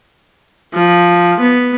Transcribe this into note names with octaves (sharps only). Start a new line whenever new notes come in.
F3
B3